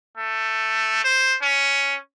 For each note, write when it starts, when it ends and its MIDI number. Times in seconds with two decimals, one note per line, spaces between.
0.18 1.00 57
1.04 1.37 72
1.42 1.97 61